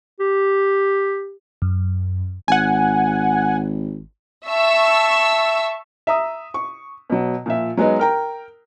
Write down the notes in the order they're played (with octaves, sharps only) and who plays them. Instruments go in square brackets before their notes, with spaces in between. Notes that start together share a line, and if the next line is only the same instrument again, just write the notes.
[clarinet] G4
[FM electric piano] F#2
[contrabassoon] G#1 [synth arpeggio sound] F#5 G#5
[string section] E5 A5 C#6 E6
[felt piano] E5 A#5 D#6
C#6
B2 F#3
A#2 F3 E5
F#3 G#3 B3 D#4
A#4 G5 A#5